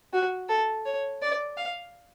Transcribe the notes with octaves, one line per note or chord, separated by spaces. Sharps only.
F#4
A4
C#5
D5
F5